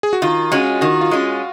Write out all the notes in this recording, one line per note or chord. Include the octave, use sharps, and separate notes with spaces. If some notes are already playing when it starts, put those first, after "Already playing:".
G#4
F#4
D#3 F4
G#3 C#4 F#4
D#3 F#4
F4
G#3 C#4